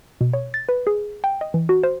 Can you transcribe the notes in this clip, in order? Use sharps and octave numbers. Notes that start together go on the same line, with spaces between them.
B2
C#5
A6
B4
G#4
G5
D#5
E3
F#4
C5